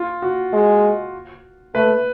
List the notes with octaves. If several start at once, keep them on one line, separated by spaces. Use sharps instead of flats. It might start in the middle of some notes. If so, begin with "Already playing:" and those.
Already playing: F4
F#4
G#3
A3 B4